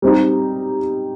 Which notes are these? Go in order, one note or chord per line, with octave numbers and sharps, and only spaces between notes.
G3 C4 D#4 G4